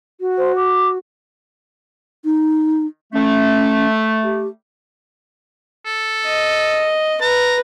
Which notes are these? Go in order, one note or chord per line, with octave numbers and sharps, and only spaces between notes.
F#4
C5
D6
D#4
A3 C#4
G4
A4
D#5
B4 A#5